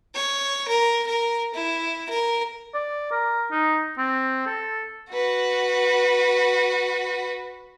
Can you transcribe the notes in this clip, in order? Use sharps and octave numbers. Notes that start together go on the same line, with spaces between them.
C#5
A#4
A#4
E4
A#4
D5
A#4
D#4
C4
A4
F#4 B4